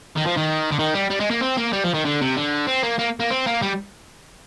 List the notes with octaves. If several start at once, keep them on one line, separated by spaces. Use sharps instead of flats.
D#3
F3
D#3
D3
D#3
G3
G3
G#3
A#3
C4
A#3
G3
F3
D#3
D3
C3
D3
C4
A#3
A#3
A#3
C4
A#3
G3